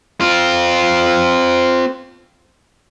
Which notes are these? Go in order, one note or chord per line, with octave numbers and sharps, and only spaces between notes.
C4 F4